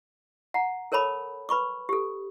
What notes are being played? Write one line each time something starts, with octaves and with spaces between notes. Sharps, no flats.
F#5 A#5
A4 A#4 C#5 A5 B5 D6
B4 B5 C#6 D6
G4 A4